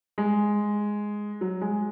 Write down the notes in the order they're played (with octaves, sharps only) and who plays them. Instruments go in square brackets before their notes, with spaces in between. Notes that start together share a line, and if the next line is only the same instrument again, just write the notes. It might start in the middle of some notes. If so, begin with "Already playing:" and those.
[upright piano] G#3
F#3
G#3